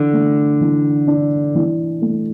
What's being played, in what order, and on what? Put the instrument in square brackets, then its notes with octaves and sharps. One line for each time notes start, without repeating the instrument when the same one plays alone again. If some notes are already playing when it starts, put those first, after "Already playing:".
Already playing: [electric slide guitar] D3 [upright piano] E3
[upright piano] A3
E3
D4
E3
A3